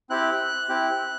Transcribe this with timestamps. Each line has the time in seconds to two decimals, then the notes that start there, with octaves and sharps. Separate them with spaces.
0.10 C4 E4 G4 F#6
0.69 C4 E4 G4